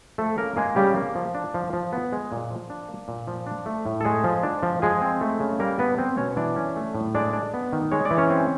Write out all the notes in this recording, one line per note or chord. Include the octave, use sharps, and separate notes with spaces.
F3 A3 A4
C#3 A#3 A#4
G#3 A#3 G#4
C#3 G3 G4
A#3
F3
D4
F3
F3
B3
G#3
A#2
F3
D4
A#3
A#2
F3
D4
A3
A2
A4
G#3 A3 G#4
F3
D4
F3
F3 G#3 G#4
C4
A3
C#3
G3 A#3 A#4
B3 D4 B4
B3 C4 C5
B2 C#4 C#5
C#5
E3 D4 D5
C#4
A3
A2
G#3 D4 D5
D4
B3
D#3
G#3 C#5
D5
E3
C#4 C#5
C4